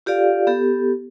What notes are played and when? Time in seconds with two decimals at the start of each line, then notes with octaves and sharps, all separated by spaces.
0.06 F4 G4 A4 D5 F5
0.47 B3 G4 A4